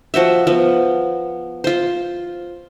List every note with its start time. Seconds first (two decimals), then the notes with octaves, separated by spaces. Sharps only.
0.14 F3 F#4 C5 E5
0.47 F3 B3
1.64 F4 C5